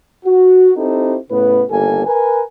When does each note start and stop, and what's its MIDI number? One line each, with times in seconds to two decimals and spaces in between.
0.25 0.70 66
0.76 1.16 60
0.76 1.16 63
0.76 1.16 64
0.76 1.16 67
0.76 1.16 69
0.76 1.16 72
1.30 1.62 45
1.30 1.62 49
1.30 1.62 59
1.30 1.62 71
1.70 2.04 31
1.70 2.04 39
1.70 2.04 58
1.70 2.04 67
1.70 2.04 69
1.70 2.04 80
2.06 2.41 70
2.06 2.41 71
2.06 2.41 80